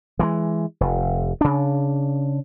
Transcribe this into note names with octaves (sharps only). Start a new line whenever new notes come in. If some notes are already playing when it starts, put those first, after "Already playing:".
E3 G3 G#3
F1
C#3 D4